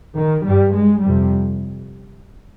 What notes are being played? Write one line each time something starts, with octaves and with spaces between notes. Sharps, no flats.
D#3
G2 G3
G#3
F2 C3 G3